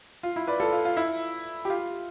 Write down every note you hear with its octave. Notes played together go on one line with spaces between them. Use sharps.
F4
E4
B4 D5
F4 A4
F4
F4
E4
G4
F4